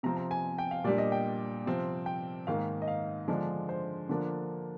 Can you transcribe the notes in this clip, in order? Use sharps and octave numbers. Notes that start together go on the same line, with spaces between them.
C3 F3 C4 A#5
A#5
G#5
G5
F5
A#2 G3 D4 D5
D#5
G5
C3 F3 C4
G5
G#2 D#3 A#3 F5
D#5
F5
D3 F3 G#3 D4
C5
D3 F3 A#3 D4